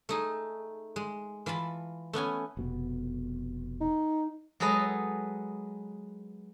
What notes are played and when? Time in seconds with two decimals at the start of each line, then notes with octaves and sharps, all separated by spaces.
0.09 A3 D#4 G#4
0.96 G#3
1.46 E3 F4 A5 B5
2.13 A3 B3 C#4 G#5
2.57 F1 B2 B3
3.81 D#4
4.60 F#3 G#3 G#4 A4 B4 D#5